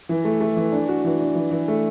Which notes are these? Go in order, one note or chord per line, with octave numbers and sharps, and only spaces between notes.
E3
A3
A3
E3
D4
F#4
E3
D4
E3
E3
A3